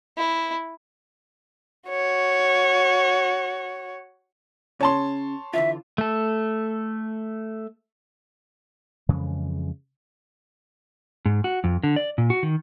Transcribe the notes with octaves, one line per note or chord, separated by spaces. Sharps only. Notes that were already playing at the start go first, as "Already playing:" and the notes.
E4
F#4 C#5
C#3 C#4 C#5 A5 C6
D3 E3 F4 E5
A3 A4
F2 C#3 E3 G#3
G#2
F#4
F2
D3
D5
A#2
F#4
D#3